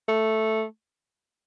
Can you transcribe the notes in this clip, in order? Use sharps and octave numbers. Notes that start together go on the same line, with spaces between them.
A3